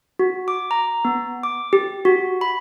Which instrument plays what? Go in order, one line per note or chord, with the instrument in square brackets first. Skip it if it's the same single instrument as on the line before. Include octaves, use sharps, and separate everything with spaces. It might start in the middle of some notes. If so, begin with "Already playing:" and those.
[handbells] F#4
D6
A#5
B3
D6
G4
F#4
B5